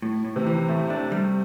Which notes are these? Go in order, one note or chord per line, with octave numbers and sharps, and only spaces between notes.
A2
A2
C3
E3
A2 A3
A3 D4
G3